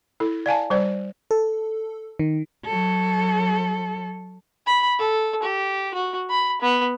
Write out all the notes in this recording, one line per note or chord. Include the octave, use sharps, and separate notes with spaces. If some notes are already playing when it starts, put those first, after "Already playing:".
E4 A4
D5 F5 G#5 A5
G3 C5 D5
A4
D#3
F#3 A4
B5
A4
G4
F#4
B5
B3